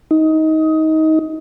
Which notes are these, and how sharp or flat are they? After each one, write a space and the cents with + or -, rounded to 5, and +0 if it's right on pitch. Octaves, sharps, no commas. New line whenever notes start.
D#4 +20